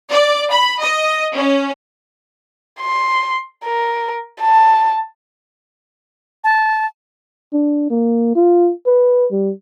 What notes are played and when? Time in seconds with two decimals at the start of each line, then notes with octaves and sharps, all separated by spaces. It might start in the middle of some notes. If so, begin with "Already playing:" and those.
0.12 D5
0.52 B5
0.83 D#5
1.35 C#4
2.80 C6
3.65 A#4
4.41 A5
6.44 A5
7.53 D4
7.90 A#3
8.35 F4
8.86 B4
9.31 G3